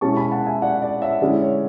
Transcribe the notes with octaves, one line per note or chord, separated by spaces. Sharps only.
B2 G#3 C#4 E4 A5 C#6
G#5 B5
F#5 A5
E5 G#5
D5 F#5
D5
C#5 E5
D3 G#3 C#4 E4 D5
C#5